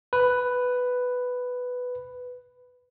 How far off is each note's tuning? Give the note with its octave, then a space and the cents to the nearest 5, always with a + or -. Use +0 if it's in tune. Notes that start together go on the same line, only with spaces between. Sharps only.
B4 +5